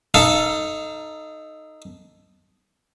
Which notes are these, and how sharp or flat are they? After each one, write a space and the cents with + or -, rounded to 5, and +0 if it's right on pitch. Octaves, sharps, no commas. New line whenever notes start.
D#4 +0 A4 +0 F5 -35